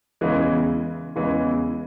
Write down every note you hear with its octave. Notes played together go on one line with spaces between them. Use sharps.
E2 C#3 E3 G#3
E2 C#3 E3 G#3